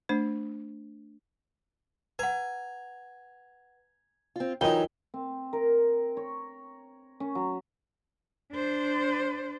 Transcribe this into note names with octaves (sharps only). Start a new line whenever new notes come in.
A3 D4 C5
B4 F#5 G#5 A#5
C4 F4
E3 F#3 D#4 F4 A#4 D#5 G5 G7
C4
A#4
C#5
C#4
F#3
D4 C5